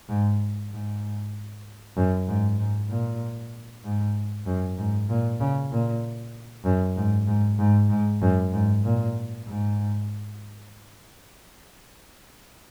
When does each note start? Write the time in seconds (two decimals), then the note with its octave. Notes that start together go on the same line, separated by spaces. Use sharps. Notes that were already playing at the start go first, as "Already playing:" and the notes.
0.09 G#2
0.71 G#2
1.96 F#2
2.28 G#2
2.58 G#2
2.90 A#2
3.84 G#2
4.46 F#2
4.78 G#2
5.09 A#2
5.40 C#3
5.71 A#2
6.65 F#2
6.96 G#2
7.27 G#2
7.59 G#2
7.90 G#2
8.21 F#2
8.53 G#2
8.84 A#2
9.46 G#2